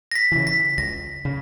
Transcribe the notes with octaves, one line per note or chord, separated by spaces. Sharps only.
A#6
B6
C#3 E3
B6
C#2 A#6
C#3